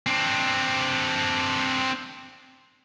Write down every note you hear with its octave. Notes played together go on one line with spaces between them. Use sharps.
C4 D4